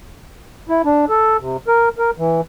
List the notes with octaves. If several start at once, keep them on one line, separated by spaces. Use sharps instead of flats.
E4
D4
A4
C3
A#4
A#4
E3